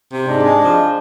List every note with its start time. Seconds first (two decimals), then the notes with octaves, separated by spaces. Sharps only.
0.10 C3
0.26 G#2 D4
0.43 G#3
0.60 F3